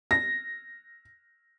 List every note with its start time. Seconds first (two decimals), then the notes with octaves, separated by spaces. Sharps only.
0.11 A#6